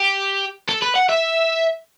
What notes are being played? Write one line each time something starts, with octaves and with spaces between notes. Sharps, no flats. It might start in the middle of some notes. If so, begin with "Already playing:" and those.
Already playing: G4
A4
B4
F#5
E5